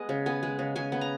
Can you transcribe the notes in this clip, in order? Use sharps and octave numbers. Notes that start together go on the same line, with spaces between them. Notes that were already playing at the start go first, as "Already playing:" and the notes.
Already playing: G#3 B3 D#5
C#3
B3 G#5
G#3
C#3
C#3 G#5
B3
A#5